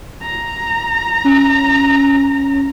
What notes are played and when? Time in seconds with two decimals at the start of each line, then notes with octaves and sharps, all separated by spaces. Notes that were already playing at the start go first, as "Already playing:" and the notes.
0.22 A#5
1.24 C#4